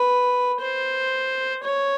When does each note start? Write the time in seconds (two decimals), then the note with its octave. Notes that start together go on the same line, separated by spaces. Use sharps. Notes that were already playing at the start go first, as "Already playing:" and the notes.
Already playing: B4
0.61 C5
1.64 C#5